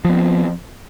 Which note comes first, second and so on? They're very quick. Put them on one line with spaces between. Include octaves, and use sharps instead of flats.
F3 B3 C4